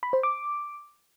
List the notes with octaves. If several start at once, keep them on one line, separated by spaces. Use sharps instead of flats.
B5
C5
D6